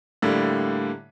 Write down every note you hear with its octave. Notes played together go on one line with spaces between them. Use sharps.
A2 D3 G3 A#3